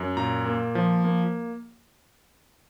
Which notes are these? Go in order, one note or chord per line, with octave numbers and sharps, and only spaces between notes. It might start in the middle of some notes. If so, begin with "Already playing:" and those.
Already playing: F#2
A#2 A#5
A#3
F3
A#3